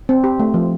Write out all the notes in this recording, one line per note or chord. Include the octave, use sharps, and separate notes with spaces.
C4
G4
A3
F3